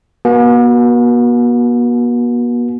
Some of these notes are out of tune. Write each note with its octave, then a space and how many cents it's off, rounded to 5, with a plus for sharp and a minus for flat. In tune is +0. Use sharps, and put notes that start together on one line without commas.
B3 -45 F#4 +0 G#5 +35